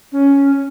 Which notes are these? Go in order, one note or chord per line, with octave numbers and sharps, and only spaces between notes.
C#4